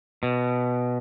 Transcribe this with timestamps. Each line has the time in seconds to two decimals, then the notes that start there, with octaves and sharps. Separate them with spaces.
0.23 B2